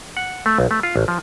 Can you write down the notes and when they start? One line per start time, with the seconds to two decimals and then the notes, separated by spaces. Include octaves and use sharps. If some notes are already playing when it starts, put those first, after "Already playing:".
0.17 F#5
0.46 A3
0.58 B1
0.71 A3
0.83 F4
0.96 A1
1.08 F3